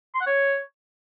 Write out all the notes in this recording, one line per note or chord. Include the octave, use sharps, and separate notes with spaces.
C6
F#5
C#5